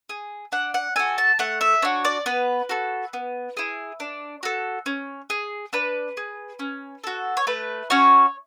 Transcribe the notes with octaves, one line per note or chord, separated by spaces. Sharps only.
G#4
D4 F#5
F#5
F#4 A4 G#5
A5
A3 F#5
E5
D4 F#4 C#5
D5
B3 B4
F#4 A4
B3
E4 G#4
D4
F#4 A4
C#4
G#4
D4 B4
G#4
C#4
F#4 A4
C#5
A3 B4
C#4 F#4 C#5